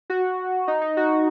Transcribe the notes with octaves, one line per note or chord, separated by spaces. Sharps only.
F#4
D#4
D#4
F#4